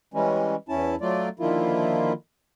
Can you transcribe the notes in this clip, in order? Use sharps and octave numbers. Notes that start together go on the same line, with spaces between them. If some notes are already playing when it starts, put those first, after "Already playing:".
E3 G3 G#3 C#4
E2 C#4 E4 A5
F#3 A3 F4 D5
D3 D#3 F3 A#3 E4 F4